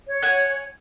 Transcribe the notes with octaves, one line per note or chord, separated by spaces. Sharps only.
C#5
F#5 G#5